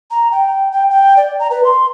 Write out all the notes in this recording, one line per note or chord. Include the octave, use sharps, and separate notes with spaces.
A#5
G5
G5
G5
D5
A#5
B4
C6